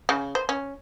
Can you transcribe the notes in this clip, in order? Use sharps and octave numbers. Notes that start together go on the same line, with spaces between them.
C#3
C5
C#4